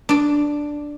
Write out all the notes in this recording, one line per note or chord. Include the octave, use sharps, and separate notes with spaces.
D4 D5